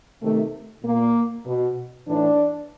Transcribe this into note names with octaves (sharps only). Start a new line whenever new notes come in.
C3 D#3 A3
A#2 A#3
B2
A2 E3 D4